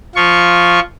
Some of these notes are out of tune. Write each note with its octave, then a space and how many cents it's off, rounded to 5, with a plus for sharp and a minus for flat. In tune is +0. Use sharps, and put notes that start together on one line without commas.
F3 +0 F4 +0 C#6 +0